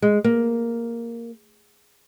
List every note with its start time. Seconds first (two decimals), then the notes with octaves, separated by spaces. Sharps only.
0.02 G#3
0.24 A#3